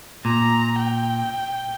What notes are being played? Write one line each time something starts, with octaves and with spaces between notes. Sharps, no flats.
A#2 A#5
G5